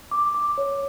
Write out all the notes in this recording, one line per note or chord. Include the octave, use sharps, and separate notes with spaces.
D6
D6
C#5